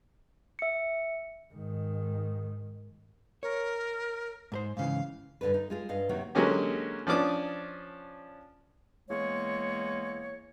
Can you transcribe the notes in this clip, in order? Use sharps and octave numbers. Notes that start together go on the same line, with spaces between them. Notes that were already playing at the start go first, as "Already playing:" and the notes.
E5 C#7
G#2 D#3
A#4 C#5
G#2 A#4 C5
G#2 C#3 E3 F5
G2 D3 D4 B4
D#4
G#3 F4 G#4
G2 D#5 F5
C3 D#3 F#3 A#3 F#4
D3 F#3 G#3 A#3 C#4 G4
F3 C#4 D4 D6 D#6
E2 G#3 A#3 C#5